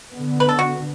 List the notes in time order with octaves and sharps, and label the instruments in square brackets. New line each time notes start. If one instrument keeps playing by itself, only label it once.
[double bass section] D3 B3
[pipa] B4
A4
F#4